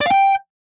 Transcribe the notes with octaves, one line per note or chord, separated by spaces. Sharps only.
D5
F5
G5